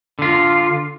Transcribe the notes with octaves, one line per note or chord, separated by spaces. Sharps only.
D3 F4